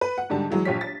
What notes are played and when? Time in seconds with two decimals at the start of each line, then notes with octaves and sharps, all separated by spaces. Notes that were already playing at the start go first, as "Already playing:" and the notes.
0.01 B4
0.18 F#5
0.30 G#2 D3 G3 A5
0.50 E3 F#3 G#3
0.65 A#1 F4 G4 C#5 B6
0.81 A6